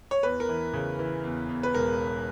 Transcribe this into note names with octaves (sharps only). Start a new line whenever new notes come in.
C#5
E2 B4
A#4
E3
C#3
E3
E2
E2
B4
E1 A#4